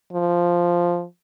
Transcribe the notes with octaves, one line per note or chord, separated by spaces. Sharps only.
F3